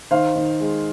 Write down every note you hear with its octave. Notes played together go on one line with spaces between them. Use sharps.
D#3 C5 F5
D#3
G#3